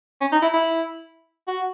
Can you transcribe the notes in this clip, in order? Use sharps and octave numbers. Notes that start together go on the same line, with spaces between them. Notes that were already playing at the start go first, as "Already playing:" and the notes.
C#4
D#4
E4
E4
F#4